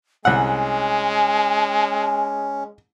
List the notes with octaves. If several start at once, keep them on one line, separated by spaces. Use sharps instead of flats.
C2 G#3 C#4 F#5 G#5